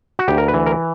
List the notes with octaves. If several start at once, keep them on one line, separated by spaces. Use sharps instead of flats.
F#4
D2 G4
A#4
B4
E3
A#4